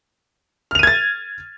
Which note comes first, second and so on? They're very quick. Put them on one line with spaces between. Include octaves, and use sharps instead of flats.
F6 F7 D#7 G#6 A6